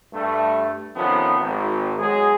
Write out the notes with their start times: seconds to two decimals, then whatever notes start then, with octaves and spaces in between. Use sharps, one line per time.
0.13 G2 A3
0.95 C3 D#3 F3 B3 C#4 A4
1.39 G#1
1.98 B1 F#3 G#3 G#4